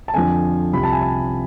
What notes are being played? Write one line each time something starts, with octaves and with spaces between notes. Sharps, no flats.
A5
F2 D3 F3 G#5
C2 C3 F3 B5
A5
G#5
A5